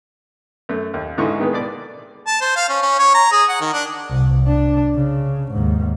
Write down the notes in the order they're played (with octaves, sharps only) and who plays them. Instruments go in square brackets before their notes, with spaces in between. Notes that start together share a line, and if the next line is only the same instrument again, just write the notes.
[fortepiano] F#2 A3
D#2
G#2 D3 E3 D#4 E4 C#6
D#3 G#3 A#3 B3
B2 D5 D6
[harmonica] A5
C5
F5
C#4
C#4
C#5
A#5
G#4
F#5
D#3
D4
[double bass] C2
D4
C#3
D#2 G#2